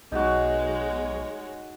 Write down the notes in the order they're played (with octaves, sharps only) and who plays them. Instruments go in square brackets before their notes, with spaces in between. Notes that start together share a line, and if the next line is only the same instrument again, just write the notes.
[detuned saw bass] B1 [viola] G#3 C#5 [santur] D#4 F#4